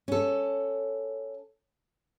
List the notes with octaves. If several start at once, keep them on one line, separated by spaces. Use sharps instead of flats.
C#4 A4